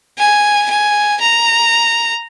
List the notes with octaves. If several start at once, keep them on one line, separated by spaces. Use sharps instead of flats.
G#5
G#5
A#5